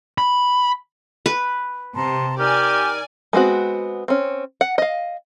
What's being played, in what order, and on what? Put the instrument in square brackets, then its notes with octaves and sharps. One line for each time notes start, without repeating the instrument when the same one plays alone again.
[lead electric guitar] B5
[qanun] B4
[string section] C3 [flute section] A5 A#5 C6
[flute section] D#4 A#4 F6 [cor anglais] G4 [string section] D5 G#5
[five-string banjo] G#3 B3 C4 F#4
C4 C#4
F#5
D#5 F5